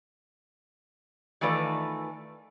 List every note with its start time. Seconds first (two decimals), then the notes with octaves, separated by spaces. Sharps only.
1.41 D#3 E3 A3 F4 B4 D5